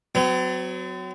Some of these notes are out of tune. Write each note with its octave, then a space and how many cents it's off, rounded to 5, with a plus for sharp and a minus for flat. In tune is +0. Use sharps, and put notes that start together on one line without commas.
F#3 +0 C4 -45